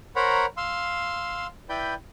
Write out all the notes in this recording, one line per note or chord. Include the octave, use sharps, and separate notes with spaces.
A#4 C5 C#5 F#5 A#5 B5
F5 C6 E6
E4 B4 D5 G5 B5 G6